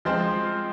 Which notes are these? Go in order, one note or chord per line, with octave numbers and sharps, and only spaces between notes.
F3 G#3 C4 F4 C5